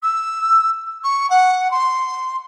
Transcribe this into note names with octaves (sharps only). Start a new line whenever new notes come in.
E6
C#6
F#5
C6